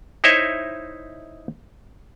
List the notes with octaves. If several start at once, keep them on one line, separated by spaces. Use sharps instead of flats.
D#4 E4 C5 C#5 D#5 E5